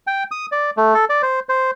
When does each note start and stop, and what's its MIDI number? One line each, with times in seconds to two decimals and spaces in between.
0.07 0.24 79
0.31 0.46 87
0.52 0.70 74
0.77 0.94 57
0.94 1.05 69
1.10 1.22 74
1.22 1.40 72
1.49 1.71 72